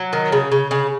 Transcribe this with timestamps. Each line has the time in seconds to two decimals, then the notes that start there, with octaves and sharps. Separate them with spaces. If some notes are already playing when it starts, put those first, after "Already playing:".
Already playing: F#3
0.13 D#3
0.32 C#3
0.52 C#3
0.71 C#3